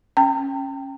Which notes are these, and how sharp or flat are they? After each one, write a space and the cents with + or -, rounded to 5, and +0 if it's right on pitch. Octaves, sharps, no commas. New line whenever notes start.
C#4 -15 G5 +0 A#5 -45